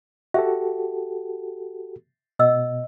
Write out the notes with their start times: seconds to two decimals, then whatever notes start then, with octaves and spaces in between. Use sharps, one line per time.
0.34 F#4 G4 A4 E5
2.39 B2 D#5 F#5 E6